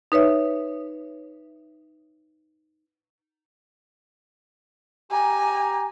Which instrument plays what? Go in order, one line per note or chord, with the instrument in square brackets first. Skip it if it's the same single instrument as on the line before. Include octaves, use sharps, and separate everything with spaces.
[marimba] D#4 B4 C#5 E5
[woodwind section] G4 A#5 [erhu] G#5